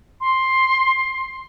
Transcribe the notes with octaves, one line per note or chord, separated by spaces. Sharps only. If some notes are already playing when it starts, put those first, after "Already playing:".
C6